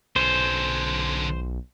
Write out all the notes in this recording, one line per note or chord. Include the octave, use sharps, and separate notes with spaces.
B1 D3 C#4 C5